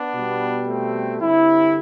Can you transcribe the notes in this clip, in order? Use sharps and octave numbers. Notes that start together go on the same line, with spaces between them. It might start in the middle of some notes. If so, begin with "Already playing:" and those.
Already playing: B3 D4
B2 G3
A3 C4
G2 D3 G3 C4 E4